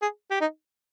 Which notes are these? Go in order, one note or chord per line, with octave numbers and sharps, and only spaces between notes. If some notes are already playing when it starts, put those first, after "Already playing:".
G#4
G4
D#4